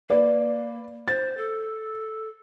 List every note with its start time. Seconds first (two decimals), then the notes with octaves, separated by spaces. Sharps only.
0.10 A#3 B4 D5
1.08 C5 A6
1.37 A4